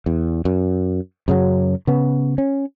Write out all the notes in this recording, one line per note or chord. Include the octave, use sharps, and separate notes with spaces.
E2
F#2
F#2 C#3 F#3
C#3 B3
C#4